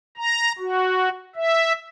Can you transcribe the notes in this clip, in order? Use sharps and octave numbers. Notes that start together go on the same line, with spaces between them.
A#5
F#4
E5